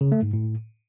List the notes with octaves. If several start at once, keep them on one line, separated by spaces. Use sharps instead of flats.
C#3
A3
G#2
A2